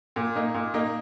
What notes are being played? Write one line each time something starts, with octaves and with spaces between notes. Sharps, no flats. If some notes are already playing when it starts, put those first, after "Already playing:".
A#2
A#3 D#4
A#2
A#3 D#4